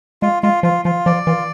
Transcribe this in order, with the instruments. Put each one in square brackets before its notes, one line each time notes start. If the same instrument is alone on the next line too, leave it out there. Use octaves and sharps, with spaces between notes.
[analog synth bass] G#3 [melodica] F4
[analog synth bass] G#3 [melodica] F4
[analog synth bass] F3 [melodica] F4
[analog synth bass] F3 [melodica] F4
[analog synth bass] F3 [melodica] D5
[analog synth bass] E3 [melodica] F4